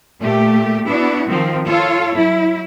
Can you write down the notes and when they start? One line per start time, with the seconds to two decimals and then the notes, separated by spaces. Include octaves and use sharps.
0.19 A#2 A3 G4
0.86 B3 D4 E4 F#4
1.28 D#3 F3 C4
1.65 F4 A4 C#5
2.15 F#3 E4